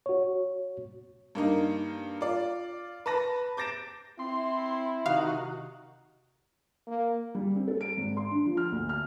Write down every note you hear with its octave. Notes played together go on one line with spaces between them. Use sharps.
F#4 C#5
G2 A#3 D#4
F4 D5
B4 A5 B5 A#6
D6 G6 A6 A#6 D7 E7
C4 E4 C6
C3 D#3 F#4 F5
A#3
G3
C4
A4
D7
G#1
C6
D4
F3
F6
D2
F6